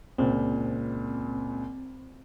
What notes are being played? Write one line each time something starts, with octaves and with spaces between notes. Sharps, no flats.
C#2 A#2 C4